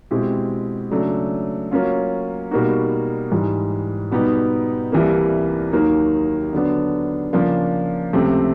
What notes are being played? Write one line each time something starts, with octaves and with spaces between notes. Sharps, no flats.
B2 G#3 C4 E4 G4
C#3 F#3 A3 D4
F#3 A#3 C#4 F4
B2 G3 A#3 D#4 F#4
G#2 E3 G3
B2 G3 B3 D#4 G4
C2 C3 E3 G3 A#3
D#2 D#3 F#3 A#3 D#4
D3 F#3 B3 D4
C#3 F3 A#3 D4 F4
C#2 C3 F3 A3 C4